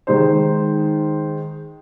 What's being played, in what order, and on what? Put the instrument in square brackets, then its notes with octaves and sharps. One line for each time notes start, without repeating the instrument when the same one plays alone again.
[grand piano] D#3 G#3 D#4 C5